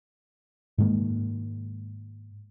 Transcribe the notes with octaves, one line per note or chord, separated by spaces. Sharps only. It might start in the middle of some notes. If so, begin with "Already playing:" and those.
G#2 D#3 G#3 A#3